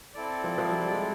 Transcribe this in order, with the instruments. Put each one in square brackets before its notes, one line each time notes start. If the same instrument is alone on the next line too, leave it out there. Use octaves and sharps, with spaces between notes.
[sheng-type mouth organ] C4 E4 A4 D5
[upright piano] F3
F3
F#3
G3
G#3